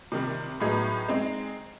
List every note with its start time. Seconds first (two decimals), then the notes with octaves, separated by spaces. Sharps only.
0.12 C3 D#3 G3
0.60 A2 F#3 B3 D#4 G#4
1.08 G#3 C4 D#4